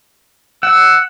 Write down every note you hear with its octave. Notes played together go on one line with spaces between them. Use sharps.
F#5 E6